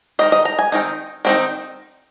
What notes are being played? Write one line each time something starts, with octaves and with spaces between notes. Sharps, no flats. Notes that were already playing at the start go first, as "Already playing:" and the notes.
D#3 C4 D#4 D#5
D#5
A#5
G#5
D#3 C4 D#4
D#3 C4 D#4